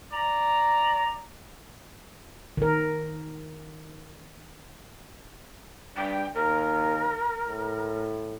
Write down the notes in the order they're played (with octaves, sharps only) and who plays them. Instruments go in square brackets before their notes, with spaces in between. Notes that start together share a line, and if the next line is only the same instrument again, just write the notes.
[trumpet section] D5 A#5
[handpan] D#3 A#4
[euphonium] G2 [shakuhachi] G5
[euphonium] D#2 [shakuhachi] A#4
[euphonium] A2